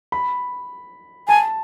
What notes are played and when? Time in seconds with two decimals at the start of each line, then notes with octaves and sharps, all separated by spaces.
0.12 B5
1.28 G#5 A5